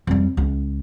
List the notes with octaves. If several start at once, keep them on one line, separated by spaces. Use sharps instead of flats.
F2 G3
C#2